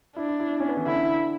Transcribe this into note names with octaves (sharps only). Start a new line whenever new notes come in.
D4 E4
E4
E4
C#4
B3
E3
D3 E4